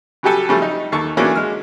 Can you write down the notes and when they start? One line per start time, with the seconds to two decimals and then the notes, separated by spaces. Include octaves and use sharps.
0.23 C#3 F#3 G3 G4 A4 G#5
0.49 C#3 F3 G3 A3
0.62 D#4
0.92 D#2 A4 C#6
1.17 E3 F#3 A3 A#3 C#4 D4
1.35 G#3 F6